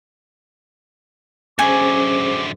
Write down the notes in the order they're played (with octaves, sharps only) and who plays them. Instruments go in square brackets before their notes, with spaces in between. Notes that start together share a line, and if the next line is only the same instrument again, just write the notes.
[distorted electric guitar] F#2 D3 [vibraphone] C#4 G#4 C5 [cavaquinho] G#5 [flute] D6